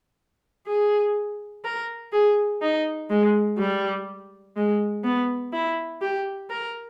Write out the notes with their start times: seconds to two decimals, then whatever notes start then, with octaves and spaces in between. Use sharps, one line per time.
0.67 G#4
1.64 A#4
2.13 G#4
2.62 D#4
3.10 G#3
3.58 G3
4.57 G#3
5.04 B3
5.53 E4
6.02 G4
6.50 A#4